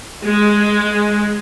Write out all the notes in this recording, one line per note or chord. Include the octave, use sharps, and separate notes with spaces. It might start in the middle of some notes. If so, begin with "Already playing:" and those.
G#3